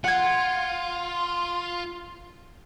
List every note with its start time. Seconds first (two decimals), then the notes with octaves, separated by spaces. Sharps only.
0.04 F4 F#5 G#6